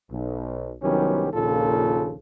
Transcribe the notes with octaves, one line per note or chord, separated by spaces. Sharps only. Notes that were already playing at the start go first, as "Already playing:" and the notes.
B1
C2 D#3 F#3 B3 C#4 G4
A#1 D#2 A#2 C#3 F4 A4